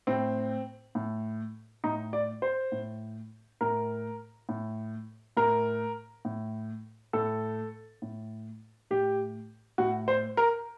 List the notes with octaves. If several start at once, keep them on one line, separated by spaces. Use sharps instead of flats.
A2 C4
A2
A2 D#4
D5
C5
A2
A2 A#4
A2
A2 A#4
A2
A2 A4
A2
A2 G4
A2 F#4
C5
A#4